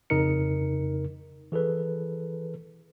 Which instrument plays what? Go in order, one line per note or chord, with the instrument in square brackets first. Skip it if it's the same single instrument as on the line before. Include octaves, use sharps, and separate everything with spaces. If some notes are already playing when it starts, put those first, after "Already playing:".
[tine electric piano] F2 C#3 D#4 A#4 C#7
E3 G#4 A4 B4